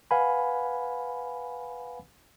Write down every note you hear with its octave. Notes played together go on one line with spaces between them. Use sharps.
B4 F5 F#5 G#5 B5